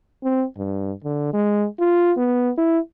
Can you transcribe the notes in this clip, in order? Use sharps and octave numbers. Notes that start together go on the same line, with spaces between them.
C4
G2
D3
G#3
F4
B3
E4